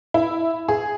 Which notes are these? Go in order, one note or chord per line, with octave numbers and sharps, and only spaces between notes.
E4
G#4